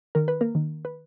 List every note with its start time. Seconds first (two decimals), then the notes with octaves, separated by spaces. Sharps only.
0.15 D#3 A#4
0.28 B4
0.41 A#3 A#4
0.55 D#3
0.85 B4